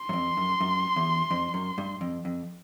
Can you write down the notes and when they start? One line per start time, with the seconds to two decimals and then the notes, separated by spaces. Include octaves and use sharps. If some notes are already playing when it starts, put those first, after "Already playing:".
Already playing: C6
0.09 F#2
0.13 F2
0.37 F#2
0.61 F#2
0.96 E2
1.31 F2
1.54 F#2
1.78 G2
2.01 F2
2.25 F2